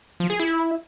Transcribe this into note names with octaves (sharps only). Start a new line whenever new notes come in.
F3
G#4
E4